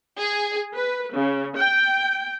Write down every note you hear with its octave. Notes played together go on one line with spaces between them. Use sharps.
G#4
B4
C#3
G5